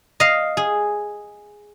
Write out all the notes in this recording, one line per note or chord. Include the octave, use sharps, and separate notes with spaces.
D#5 F5
G#4